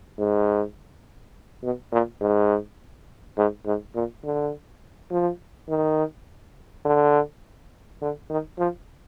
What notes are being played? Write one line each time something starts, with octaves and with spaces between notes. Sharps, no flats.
G#2
B2
A#2
G#2
G#2
G#2
A#2
D3
F3
D#3
D3
D3
D#3
F3